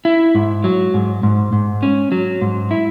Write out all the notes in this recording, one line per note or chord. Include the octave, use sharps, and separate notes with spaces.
E4
G#2
F#3
G#2
G#2
G#2
C#4
F#3
G#2
E4